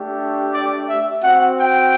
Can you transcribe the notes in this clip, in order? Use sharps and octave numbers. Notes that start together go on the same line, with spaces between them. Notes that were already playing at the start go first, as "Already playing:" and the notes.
Already playing: A3 D4 G4
D5
E5
C4 F#4 F#5
G5